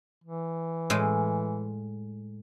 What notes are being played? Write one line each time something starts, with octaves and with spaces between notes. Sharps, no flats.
E3
A2 G#3